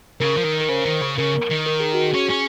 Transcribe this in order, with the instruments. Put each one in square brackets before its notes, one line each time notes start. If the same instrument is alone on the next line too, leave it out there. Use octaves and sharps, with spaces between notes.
[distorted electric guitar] C#3 [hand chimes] A#4
[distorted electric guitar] F3
D#3
[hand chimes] A#4
[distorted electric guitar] C#3 [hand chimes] C5
[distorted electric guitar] D#3
C#3
[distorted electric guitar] C#3 [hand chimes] A#4
[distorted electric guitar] D#3
[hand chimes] A#4
G#4
F#4
G#4
[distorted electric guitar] C#4
C#4